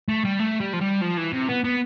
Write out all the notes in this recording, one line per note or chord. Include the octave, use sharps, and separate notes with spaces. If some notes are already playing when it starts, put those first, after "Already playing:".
A3
G3
A3
G3
F3
G3
F3
E3
C3
B3
B3